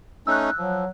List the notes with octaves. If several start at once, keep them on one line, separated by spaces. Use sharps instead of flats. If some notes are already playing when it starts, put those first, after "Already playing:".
A3 C#4 D#4 E6 F#6
F3 F#3